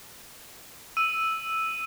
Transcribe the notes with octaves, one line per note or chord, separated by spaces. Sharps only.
E6 D#7